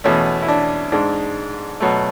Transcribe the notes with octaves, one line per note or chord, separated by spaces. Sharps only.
E2 B2 A3 C#4
E4
D4
G#2 G#3 D4
B2 F#3 A3